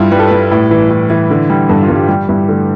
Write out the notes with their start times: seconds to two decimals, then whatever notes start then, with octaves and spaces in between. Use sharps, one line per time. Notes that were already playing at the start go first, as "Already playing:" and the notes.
Already playing: G2 G3 E4 F4
0.12 G3 B4
0.19 A4
0.28 G3 B4
0.51 A2
0.71 E3
0.90 A2
1.10 E3
1.30 D3
1.50 G3
1.69 G2 A4
1.83 F4
1.89 G2
1.96 G4
2.09 G3 G4
2.28 G2 E4
2.48 D3 A3